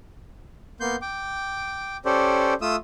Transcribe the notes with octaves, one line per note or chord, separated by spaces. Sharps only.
A#3 B3 C6 G6
G5 D6
C#4 G4 A4 C5 D5
A3 F4 D#6 E6